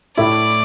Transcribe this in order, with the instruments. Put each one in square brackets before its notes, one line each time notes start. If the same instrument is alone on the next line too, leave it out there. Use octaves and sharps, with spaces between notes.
[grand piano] A2 A3 E4 [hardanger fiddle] D5